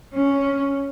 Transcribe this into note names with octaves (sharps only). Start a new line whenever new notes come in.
C#4